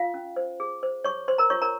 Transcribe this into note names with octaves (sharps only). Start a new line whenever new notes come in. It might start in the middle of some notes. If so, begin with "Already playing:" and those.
Already playing: F4 F5
C#4
C5
G#4
C5
G#4 C#5 C#6
C5 C6
A#4 A#5
F4 C#5 C#6
A#4 A#5